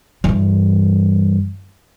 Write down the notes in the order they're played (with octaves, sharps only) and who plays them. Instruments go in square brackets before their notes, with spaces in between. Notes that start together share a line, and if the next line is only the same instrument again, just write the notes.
[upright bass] G2 E3